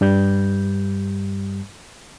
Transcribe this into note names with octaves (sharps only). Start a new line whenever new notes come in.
G2 G3 G6